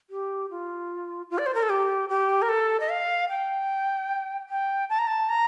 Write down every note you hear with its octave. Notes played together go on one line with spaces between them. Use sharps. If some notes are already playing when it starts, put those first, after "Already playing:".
G4
F4
F4
D5
C5
A#4
A4
G4
G4
A#4
A4
D#5
F5
G5
G5
A5
A#5
A5
A#5